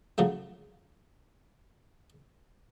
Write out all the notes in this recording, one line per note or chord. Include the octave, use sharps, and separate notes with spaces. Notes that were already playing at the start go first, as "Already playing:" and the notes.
C#3 F3 F#3 A3